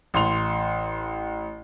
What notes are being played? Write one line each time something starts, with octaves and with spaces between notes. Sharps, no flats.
A1 C6 F7